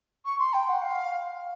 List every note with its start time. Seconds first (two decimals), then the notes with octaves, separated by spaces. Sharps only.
0.25 C#6
0.38 C6
0.53 G5
0.67 F#5
0.81 F5